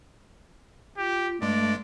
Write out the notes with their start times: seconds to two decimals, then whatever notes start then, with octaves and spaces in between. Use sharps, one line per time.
0.97 F4 G4
1.42 G2 G#3 A3 D5